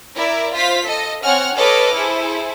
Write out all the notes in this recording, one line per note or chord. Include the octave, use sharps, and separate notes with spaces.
E4 A#4 D5 E5
F4 C5 F5 B6
A4 D#5
C4 C#5 F#5 G#5 F6
A4 B4 C#5 D#5 D6 F6
E4 G#4 A4 C5